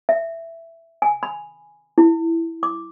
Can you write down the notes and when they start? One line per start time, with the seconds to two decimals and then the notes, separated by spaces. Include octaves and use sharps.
0.09 E5
1.02 G#5
1.23 B5
1.98 E4
2.63 D6